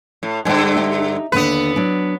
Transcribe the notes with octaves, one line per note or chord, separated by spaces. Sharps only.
A2
G2 D3 G5 G#5
D#4 G4 E5
D#2 D3 B3 D4 B4
F#3 D4